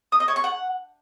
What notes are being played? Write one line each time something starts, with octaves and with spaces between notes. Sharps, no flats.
D#6
D#5
C#5
C#6
F#5